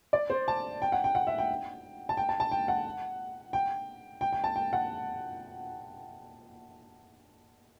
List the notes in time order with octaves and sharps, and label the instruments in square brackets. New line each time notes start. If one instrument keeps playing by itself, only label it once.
[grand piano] D5
C5
A5
G5
F#5
G5
F#5
E5
G5
A5
G5
A5
A5
G5
F#5
G5
G5
G5
A5
G5
F#5